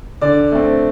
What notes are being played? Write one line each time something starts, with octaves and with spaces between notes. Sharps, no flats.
D3 D5
A3 C4